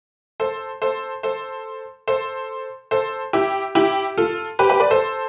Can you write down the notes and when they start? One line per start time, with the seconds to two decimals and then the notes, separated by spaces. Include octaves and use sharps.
0.40 A4 C5
0.82 A4 C5
1.23 A4 C5
2.08 A4 C5
2.91 A4 C5
3.33 E4 G4
3.75 E4 G4
4.18 F4 A4
4.59 G4 B4
4.69 G4 B4
4.80 B4 D5
4.91 A4 C5